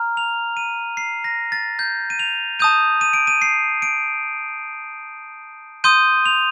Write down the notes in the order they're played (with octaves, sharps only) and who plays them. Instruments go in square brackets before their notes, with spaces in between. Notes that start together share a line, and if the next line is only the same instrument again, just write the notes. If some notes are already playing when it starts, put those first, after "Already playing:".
Already playing: [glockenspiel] A#5 F6
F7
D#7
C7
A#6
A6
G6
D#7
F7
A5 D#6 G6 D#7
D#7
D7
D#7
C7
D7
C6 D#6 G6 D#7
F7